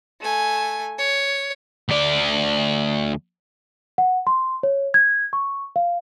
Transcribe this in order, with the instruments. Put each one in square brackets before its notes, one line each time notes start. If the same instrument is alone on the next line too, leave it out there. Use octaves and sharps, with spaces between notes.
[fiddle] A3 G#5
C#5
[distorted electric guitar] D2 D5
[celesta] F#5
C6
C#5
G#6
C#6
F5